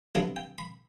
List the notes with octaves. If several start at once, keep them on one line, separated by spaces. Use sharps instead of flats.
C3 F#3 B3 D4 A4
G5
B5